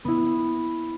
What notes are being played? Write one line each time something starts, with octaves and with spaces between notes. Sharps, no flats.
B3 E4